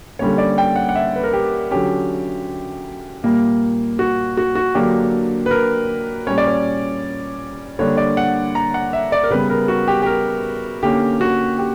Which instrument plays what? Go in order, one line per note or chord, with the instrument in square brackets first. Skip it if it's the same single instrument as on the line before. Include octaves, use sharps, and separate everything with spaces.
[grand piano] D3 G3 A#3 C#4 C#5
D5
G5
F#5
F#5
E5
B4
A#4
G4
D3 F#3 C#4 G4
A#2 G3 A#3
F#4
F#4
F#4
D3 F#3 A#3 D4 G4
B4
A#4
A#2 G3 C#4 C#5
D5
C#5
D3 G3 A#3 D4 C#5
D5
F#5
A#5
F#5
E5
D5
A#4
C#3 G3 B3 B4
A#4
F#4
G4
G4
A#4
D3 A#3 C#4 G4
F#4
G4